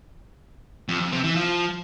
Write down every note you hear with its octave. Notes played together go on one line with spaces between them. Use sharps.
F2
F2
C3
E3
F3